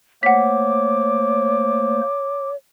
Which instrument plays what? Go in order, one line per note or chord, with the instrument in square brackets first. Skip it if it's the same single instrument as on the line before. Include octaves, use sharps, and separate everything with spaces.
[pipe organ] A3 A#3 C5 [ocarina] C#5 [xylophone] F#5 B6 [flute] D6